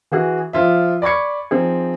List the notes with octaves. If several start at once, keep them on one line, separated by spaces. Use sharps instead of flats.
E3 F#4 G#4
F3 F4 E5
D5 B5 C#6 G#6 C#7
F3 C4 D#4 G#4